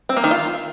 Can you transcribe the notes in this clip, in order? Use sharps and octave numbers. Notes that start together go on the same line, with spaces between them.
C4
A#3
D#3
F4